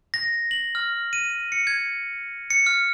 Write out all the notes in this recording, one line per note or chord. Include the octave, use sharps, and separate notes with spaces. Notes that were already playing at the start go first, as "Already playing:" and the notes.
A#6
F#7
F6
D#7
C#7
G#6
C#7
F6